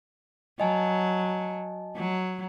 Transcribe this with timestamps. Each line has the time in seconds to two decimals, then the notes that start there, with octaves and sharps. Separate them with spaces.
0.60 F#3 D#5 G#5 A5
1.96 F#3